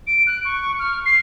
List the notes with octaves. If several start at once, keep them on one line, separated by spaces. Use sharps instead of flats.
D7
F#6
C#6
F6
C7